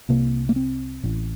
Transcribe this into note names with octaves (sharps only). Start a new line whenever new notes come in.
C2 C3 A#3
A#3
C4
A1 A2